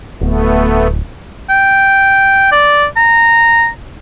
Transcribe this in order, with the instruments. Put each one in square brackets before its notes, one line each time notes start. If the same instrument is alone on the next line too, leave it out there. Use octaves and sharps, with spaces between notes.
[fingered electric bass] D1 [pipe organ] A3 B3
[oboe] G5
D5
A#5